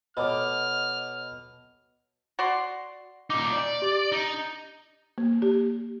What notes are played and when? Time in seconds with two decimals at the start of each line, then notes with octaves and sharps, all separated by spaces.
0.17 B2 A4 C#5 D#5 F#5 B5 D6 F6
2.39 F#4 D5 C6
3.30 A#2 D#4 D6
3.52 D5
3.82 G4 A6
4.12 D#4
5.18 A#3
5.42 G4